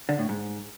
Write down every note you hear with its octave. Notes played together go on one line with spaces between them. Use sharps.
D3
A2
G#2